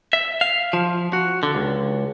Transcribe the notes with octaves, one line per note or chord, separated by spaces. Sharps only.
E5
F5
F3
F#4
D3
C#2